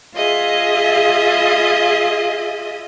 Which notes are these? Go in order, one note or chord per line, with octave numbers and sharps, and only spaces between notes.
F4 G#4 D#5 E5